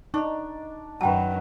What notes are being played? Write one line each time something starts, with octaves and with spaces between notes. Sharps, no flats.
D4 D#4 B5 C#6
F#2 D#3 F#3 B4 G5 A5